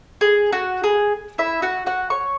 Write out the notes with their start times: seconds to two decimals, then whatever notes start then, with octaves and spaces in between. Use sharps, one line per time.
0.21 G#4
0.52 F#4
0.84 G#4
1.38 E4 E5
1.62 F#4 F#5
1.86 F#4 F#5
2.10 C#5 C#6